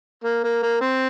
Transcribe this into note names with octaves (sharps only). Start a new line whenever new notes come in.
A#3
A#3
A#3
C4